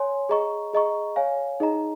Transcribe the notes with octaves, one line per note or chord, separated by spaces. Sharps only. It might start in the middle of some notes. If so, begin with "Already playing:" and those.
Already playing: C#5 G#5 C6
G#4 D#5 A#5 C#6
G#4 D#5 A#5 C#6
C#5 F5 G#5
D#4 G#4 D#5 A#5